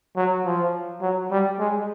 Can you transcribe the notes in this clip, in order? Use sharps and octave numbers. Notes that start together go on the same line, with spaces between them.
F#3
F3
F#3
G3
G#3